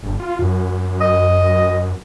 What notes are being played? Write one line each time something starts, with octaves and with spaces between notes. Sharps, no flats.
G1
F4
F#2
D#5